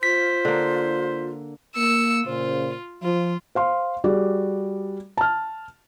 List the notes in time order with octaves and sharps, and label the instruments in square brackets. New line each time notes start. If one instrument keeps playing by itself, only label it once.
[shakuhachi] F4 [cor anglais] C5 [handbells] B6
[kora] D3 A#3
[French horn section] A#3 [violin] E6 C#7
[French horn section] A#2 C#3 C5 [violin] F4
[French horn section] F3 [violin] F4
[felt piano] C5 F5 C6
G3 F#4 G#4 D5
A5 F6